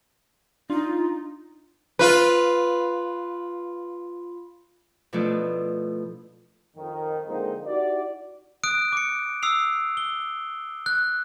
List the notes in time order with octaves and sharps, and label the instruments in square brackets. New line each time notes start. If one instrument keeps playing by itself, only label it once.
[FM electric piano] D4 [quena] D#4 [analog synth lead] F4
[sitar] F4 B4
[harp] B2 F3 A3 D4 E4 F4
[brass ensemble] F2 D#3
D3 F3 G#3 A#3 C4 D#4
D#4 E4 F#4 G4 D5
[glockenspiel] D#6 F#6 D7
D6 C#7
D#6 E6 C7 F7
G7
F#6